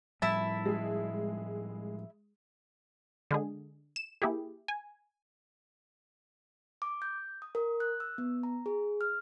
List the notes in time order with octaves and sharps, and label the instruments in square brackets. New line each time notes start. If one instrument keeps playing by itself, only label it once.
[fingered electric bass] A2 F3 G3 [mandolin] E4 A5
[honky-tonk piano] G#3 G#4
[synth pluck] D3 G#3 G#4
E7
A#3 E4 G4 G#4
G#5
[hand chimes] D6
G6
D#6
A#4
F#6
E6
B3
A#5
G#4
F6